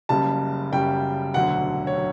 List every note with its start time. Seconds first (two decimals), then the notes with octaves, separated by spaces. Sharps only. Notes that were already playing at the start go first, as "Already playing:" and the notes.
0.09 F#1 F#2 C#3 G3 A5
0.71 F#1 F#2 C#3 G3 G5
1.34 E1 D2 D3 F#3 F#5
1.87 C#5
1.96 F#3